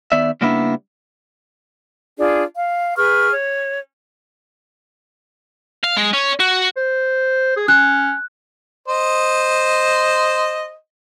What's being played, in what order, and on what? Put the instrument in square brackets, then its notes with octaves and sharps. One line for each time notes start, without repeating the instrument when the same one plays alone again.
[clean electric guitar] D#3 B3 D5 E5
C#3 G3 A#3 B3 D4 E4
[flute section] D4 F4 G#4 D5
F5
G#4 B4 C#6 F6
C#5
[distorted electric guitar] F5
G#3
C#4
F#4
[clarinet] C5
G#4
[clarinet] C#4 [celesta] F#6
[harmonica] C5 D#5